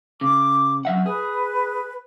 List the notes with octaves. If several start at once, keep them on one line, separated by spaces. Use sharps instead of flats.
C#3 D6
F#2 E5 F#5
G#4 B4